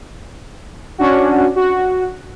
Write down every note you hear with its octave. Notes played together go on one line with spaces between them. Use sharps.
C#4 D4 F#4
F#4